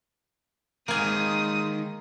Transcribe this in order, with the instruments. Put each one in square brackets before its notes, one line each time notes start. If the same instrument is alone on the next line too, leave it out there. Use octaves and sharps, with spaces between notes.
[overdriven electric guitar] D#3 C4 [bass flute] G#3 [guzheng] A#3 G#5 [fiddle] D#6